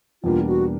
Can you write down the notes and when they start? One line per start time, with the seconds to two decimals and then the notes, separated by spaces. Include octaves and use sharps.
0.23 E2 B2 G3 A#3 D4 F4
0.48 F#4